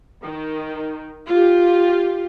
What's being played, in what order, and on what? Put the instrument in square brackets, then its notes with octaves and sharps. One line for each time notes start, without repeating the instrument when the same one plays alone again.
[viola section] D#3
F4 G4